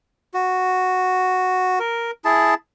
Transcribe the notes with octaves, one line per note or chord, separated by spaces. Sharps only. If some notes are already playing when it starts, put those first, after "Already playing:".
F#4
A#4
E4 G#4 A5